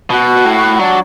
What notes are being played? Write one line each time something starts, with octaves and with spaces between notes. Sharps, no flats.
B2 F#4
A2
F#3 D4